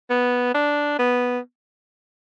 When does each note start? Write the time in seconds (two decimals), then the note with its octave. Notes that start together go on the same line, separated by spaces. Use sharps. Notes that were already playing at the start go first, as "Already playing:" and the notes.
0.10 B3
0.54 D4
0.99 B3